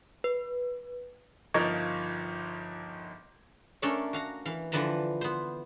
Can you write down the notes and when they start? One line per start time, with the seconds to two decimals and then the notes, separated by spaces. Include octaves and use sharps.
0.24 B4
1.54 G1 F3 D#4 A#4 C#6 G#6
3.82 A3 C#4 D4 A4 A#4
4.13 F#4 F5 A#5
4.45 E3 F5
4.72 D3 E3 F3 B4 A5 A#5
5.21 B3 C5